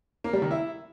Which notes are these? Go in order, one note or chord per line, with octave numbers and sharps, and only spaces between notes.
A#3
G3
D#3
E4